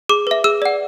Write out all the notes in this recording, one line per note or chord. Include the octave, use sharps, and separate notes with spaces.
G#4 D6
B4 E5
G#4 E6
D5 F#5